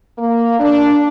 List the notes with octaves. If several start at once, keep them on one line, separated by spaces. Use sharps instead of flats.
A#3
D4